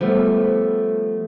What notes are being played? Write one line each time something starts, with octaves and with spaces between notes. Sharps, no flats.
F3 G3 A3 B3